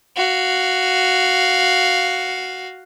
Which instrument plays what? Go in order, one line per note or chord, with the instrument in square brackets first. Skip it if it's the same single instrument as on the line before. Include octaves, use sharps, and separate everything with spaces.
[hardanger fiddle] F#4 F5